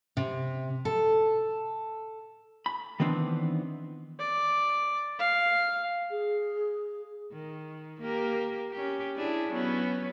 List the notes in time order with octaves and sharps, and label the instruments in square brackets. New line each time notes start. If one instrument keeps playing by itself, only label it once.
[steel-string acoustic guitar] C3
A4
[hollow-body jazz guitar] B5
D#3 E3 B3 C4 D4
[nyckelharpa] D5
F5
[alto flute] G#4
[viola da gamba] D#3
A#3 G4 A#4
C#4 G4
D4 E4 G#4
F#3 B3 C#4